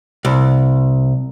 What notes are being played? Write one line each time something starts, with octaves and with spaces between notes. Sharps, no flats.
C2